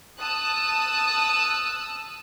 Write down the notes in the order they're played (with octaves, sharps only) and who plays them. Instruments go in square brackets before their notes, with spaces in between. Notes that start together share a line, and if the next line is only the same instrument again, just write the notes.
[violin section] A5 D#6 E6 F#6